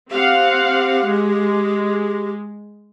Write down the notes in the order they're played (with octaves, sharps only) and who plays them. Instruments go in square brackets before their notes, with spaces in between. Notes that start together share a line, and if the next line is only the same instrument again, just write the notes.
[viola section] C4 F5 F#5 [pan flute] G4
[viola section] G#3